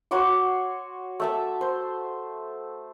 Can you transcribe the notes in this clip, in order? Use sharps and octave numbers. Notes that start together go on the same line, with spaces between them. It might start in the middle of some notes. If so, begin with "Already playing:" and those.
F#4 C#5 C6 D6
A3 E5 A5
C5